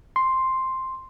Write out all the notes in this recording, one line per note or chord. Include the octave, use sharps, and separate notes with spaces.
C6